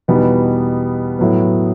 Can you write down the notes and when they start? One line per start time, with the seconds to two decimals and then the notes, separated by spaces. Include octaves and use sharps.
0.08 E2 B2 G3 B3 D#4
1.19 A2 F#3 B3